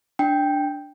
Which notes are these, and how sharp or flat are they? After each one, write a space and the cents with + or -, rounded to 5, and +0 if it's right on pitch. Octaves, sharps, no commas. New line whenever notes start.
D4 +0 G5 +5